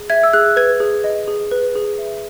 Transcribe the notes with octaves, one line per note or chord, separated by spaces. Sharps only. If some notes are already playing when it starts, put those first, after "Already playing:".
Already playing: G#4
E5 G#6
E6
G#4 F#6
B4 G#6
G#4
D#5
G#4
B4
G#4
E5